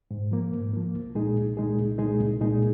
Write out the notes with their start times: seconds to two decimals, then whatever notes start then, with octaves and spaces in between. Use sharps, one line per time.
0.11 G#2
0.31 F3 A#3
0.53 G#2
0.73 F3 A#3
0.94 C2
1.15 A#2 G#3 D#4 G#4
1.36 C2
1.57 A#2 G#3 D#4 G#4
1.78 C2
1.98 A#2 G#3 D#4 G#4
2.20 C2
2.41 A#2 G#3 D#4 G#4